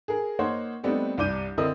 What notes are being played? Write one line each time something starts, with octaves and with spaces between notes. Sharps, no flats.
G#4 A#4
A#3 D#4 C5 C#5 F#5
G3 A3 B3 C4 D4 D#4
C2 G2 D4 D6 G6 D#7
D3 C4 E4 A#4 D#5 D#6